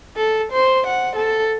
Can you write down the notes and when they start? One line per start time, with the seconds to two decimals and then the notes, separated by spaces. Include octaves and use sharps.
0.17 A4
0.53 C5
0.87 F#5
1.17 A4